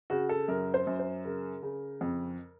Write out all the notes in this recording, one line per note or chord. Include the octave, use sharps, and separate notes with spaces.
C#3 F#4
A4
F#2 A#4
C5
F#2
C5
C#3 A#4
C#3
F2